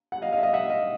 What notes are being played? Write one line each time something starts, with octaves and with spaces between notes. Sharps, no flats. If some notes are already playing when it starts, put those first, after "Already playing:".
F#5
D#5 F5
D#5 F5
E5
D#5 F5
E5 F#5
D#5 F5